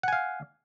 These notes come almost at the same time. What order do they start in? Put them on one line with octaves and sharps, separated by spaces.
F#5 G#5 F5